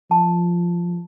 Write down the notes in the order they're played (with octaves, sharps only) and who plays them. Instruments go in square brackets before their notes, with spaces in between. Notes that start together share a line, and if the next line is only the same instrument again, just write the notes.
[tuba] F3 [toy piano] A5